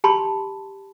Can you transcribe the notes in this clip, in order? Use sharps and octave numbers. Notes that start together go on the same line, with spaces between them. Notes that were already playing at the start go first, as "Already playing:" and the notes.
G4 A5 B5 C6